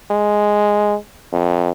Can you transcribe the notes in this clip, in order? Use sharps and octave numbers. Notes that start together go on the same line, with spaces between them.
G#3
F2